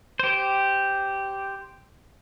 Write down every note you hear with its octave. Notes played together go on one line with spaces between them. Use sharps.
G4 C5